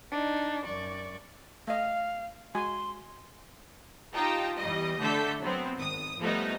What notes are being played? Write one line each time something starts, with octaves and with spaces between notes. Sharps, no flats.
D4 D#4
F#2 D5 C#6
A3 D#5 F5
G#3 F#4 G#5 C6
D#4 F4 G4 G5 A5 A#5
E2 G3 D#5
D3 A3 A4 G6 B6
F#3 B3 C4
G#1 D#6
F3 G3 A3 B3 D#4